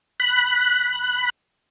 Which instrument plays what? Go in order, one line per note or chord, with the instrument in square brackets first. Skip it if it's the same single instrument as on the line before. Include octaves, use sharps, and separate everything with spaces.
[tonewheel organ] B5 F#6